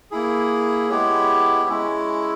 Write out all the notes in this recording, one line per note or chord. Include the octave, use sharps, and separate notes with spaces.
A#3 E4 G#4
G#3 B3 E4 G4 C#5
G#3 C#4 E4